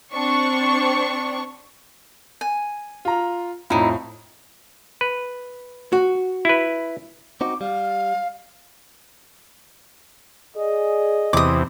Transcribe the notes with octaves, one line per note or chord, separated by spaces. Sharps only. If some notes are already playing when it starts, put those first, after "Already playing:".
C4 D4 C#6
G#5
F4 A#5
F2 A2 D#4 E4
B4
F#4
E4 B4
C4 D#4 F#4 D6
G3 F5
G#4 D5 D#5
E2 C3 D6 D#6